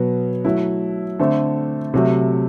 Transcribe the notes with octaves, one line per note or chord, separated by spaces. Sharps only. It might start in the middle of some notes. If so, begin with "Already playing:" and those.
Already playing: B2 F#3 B3
F#3 A3 E4
D3 A3 C4
C3 F#3 A3